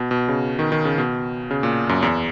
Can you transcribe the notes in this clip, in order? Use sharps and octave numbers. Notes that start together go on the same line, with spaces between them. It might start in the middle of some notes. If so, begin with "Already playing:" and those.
Already playing: B2
B2
C#3
D#3
D#3
C#3
B2
C#3
A#2
F#2
E2